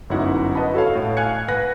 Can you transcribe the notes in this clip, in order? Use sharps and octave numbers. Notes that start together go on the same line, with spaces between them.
G1 F#2 D#4 E4 F#5
B4 D#5 F#5 A5 B5
F#4 A4 C#5 F5
A2
F5 G#5 F#6 G#6 C#7
B4 F#5 B5 F#6 A#6